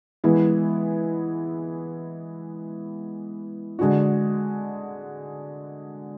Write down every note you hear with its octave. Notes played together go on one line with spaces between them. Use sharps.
E3 G#3 B3 E4
D3 G#3 D4 F#4